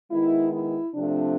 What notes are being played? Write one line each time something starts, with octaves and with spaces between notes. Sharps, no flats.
D#3 G#3 B3 E4
E4
C3 F3 A3 C4 D4